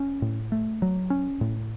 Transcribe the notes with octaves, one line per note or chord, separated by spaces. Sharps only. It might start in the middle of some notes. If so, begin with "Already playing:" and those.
Already playing: C#4
A2
A3
F#3
C#4
A2